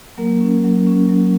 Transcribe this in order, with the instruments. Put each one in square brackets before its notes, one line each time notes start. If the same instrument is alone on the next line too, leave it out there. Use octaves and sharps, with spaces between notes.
[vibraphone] F#3 A#3 A#4
C#4
F#3
C#4
F#3